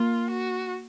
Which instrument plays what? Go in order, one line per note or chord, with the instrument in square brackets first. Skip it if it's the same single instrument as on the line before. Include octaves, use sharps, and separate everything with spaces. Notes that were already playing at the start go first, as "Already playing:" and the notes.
Already playing: [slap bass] A#3 [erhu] F4
[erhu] F#4